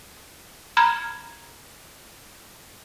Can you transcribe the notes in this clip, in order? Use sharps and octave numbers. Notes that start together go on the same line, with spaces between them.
A#5 B5 F6 G#6